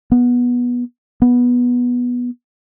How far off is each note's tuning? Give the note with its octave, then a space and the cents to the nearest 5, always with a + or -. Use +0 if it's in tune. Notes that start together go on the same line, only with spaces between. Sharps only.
B3 -15
B3 -10